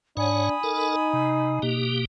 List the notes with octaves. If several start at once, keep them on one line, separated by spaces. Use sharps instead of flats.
G#2 D4 C#5 F#5 G#5 B5 D#6
D#4 A4 A#4
C3
B2 A#3 G4